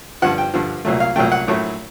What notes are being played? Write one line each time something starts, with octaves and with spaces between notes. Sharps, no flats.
G2 D3 F3 F#5
G5
G2 D3 F3
C2 A#2 F#3 A3
F5
C2 A#2 F#3 A3 G5
F#5
A#1 A2 F#3 A3